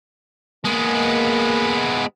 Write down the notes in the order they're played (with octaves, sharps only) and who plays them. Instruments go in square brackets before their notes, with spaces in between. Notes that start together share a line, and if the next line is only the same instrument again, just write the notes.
[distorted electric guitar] G#3 B3 [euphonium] A#3